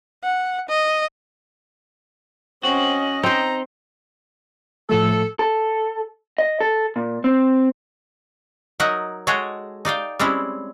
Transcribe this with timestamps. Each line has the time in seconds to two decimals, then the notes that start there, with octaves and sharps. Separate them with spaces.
0.23 F#5
0.69 D#5
2.63 C4 C#4 F#4 D#5
3.23 C4 D#4 C5 A#5
4.90 A2 F3 A3 A4
5.39 A4
6.38 D#5
6.60 A4
6.96 A#2
7.24 C4
8.80 F#3 D#4 A#4 D#5 E5 F#5
9.27 G#3 F#4 G#4 A4 C#5 G5
9.85 D#4 D5 F5 G5
10.19 G3 G#3 C4 C#4 E4